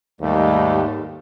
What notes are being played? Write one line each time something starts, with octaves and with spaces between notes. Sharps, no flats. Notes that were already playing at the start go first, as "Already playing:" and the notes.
D#2 G#2 G3 A3